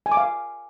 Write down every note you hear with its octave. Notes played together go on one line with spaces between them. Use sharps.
G#5
D6
F5